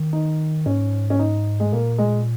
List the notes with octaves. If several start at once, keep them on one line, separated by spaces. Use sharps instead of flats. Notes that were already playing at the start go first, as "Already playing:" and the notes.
Already playing: D#3
D#4
G#2 C#4
C#4
D#4
G#3
A#2 A#3
G#3